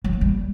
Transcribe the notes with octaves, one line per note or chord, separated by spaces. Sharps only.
F#3
A#3
G3